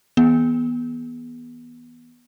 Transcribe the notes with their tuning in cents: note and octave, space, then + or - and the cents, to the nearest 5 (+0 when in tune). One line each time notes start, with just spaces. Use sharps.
E3 -40 B3 -20 G#4 +0